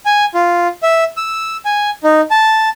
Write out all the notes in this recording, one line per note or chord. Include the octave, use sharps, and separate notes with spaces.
G#5
F4
E5
E6
G#5
D#4
A5